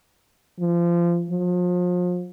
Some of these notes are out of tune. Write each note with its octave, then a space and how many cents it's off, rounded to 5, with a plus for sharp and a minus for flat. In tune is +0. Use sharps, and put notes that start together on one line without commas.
F3 -25
F3 +35